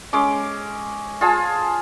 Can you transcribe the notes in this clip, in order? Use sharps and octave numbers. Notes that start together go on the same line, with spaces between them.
G#3 C#4 D6
F4 G#4 G#5 A5